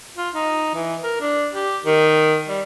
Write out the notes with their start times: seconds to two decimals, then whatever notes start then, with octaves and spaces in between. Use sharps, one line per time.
0.17 F4
0.35 D#4
0.75 E3
1.03 A#4
1.21 D4
1.53 G4
1.85 D#3
2.48 G3